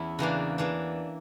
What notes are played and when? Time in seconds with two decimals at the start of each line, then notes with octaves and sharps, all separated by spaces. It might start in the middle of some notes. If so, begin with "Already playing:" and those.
Already playing: E2 C#4 E4
0.19 C#3 E3 A#3 D4 F#4
0.58 E3 A#3 D4